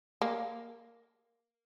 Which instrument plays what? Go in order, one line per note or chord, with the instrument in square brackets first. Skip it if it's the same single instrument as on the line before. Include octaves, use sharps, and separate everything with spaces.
[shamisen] A#3